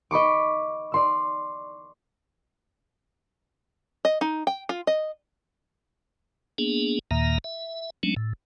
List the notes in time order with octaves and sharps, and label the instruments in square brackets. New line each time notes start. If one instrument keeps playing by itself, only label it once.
[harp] D#5 B5 C#6 D6
D5 C6 E6
[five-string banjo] D#5
D#4
G5
F4
D#5
[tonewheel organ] A#3 B3 D4 G#4
D#2 A#2 D#3 A#3 E5 A#5
E5
F#3 G#3 A3 C#4 D4
A2